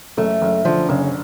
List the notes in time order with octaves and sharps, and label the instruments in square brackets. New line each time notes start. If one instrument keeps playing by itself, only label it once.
[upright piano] F#1 [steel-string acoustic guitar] A3
[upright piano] F#1
[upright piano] D3 [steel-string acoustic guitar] F3
[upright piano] F#1 [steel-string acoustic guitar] C#3